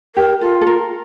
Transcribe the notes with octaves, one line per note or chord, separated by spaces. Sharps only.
G4 A#4
F4 A4
A4
A#4